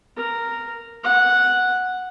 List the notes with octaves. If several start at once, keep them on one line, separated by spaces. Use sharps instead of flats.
A#4
F#5